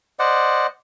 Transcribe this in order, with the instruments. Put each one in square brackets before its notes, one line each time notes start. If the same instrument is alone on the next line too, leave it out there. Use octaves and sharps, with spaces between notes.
[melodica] C5 D5 D#5 F#5